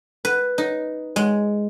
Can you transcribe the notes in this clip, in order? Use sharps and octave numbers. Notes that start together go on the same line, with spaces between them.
B4
D#4
G#3